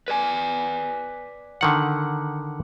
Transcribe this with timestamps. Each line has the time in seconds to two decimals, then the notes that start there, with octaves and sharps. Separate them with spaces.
0.08 B4 D5 G#5
1.61 D3 D#3 F#5